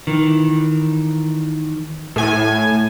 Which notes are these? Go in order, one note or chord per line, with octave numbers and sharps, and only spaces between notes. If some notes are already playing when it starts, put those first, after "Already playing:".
D#3 E3
A2 A3 G#5